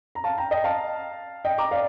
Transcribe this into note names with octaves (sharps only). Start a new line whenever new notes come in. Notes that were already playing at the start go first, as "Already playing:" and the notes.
A#5
F5 A5
G5 A#5
D#5 G5
F5 A5
D#5 G5
A#5 D6
D5 F5